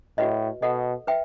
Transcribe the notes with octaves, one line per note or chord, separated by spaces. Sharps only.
A2 F#4 B4 D#5
B2 A4 D#5 F#5
B4 E5 G5